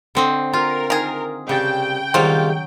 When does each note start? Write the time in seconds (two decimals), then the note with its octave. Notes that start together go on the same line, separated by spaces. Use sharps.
0.15 D3 C4 D#5
0.53 F4 A#4
0.90 D#3 G#4
1.49 C2 C#3 G5 A5
2.14 C2 D#3 F#3 G#3 C4 F4